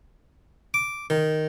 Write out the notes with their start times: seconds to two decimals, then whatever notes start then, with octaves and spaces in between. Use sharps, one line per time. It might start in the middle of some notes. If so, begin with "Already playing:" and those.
0.74 D6
1.10 D#3